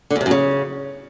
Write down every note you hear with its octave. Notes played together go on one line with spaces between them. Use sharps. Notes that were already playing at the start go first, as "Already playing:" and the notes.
D3
E2
C3
F#2
C#3